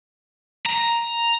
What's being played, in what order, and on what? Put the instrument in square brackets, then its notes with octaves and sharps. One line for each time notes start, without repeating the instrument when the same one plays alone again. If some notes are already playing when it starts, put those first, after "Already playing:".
[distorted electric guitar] A#5